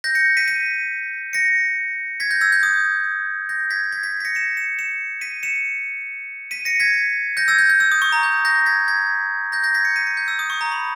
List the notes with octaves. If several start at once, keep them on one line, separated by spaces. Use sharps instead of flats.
G6 A#6
A#6 C#7
B6 D#7
B6 D#7
A#6 C#7
G#6 B6
G6 A#6
E6 G#6
G6
D#6
G6 A#6
G#6 B6
G#6 B6
G#6 B6
B6
A#6 C#7
C#7 E7
C#7 E7
C#7 E7
B6 D#7
C#7 E7
B6 D#7
A#6 C#7
G#6 B6
G6 A#6
E6 G#6
G6
G6
E6
D#6
C#6
A#5
G6
G6 A#6
G#6 B6
G#6 B6
G6 A#6
G6 A#6
G#6 B6
A#6 C#7
B6 D#7
A#6 C#7
G6
E6
D#6
C#6
A#5
B5